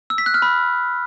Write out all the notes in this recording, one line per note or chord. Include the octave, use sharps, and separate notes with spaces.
E6
B6
F#6
F6
B5